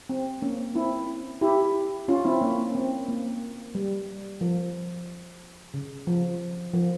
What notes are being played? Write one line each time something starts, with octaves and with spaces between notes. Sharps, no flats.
C4
A#3 C#4
C4 E4
E4 G4
C#4 F4
C4 E4
A#3 C#4
C4
A#3
G3
F3
C#3
F3
F3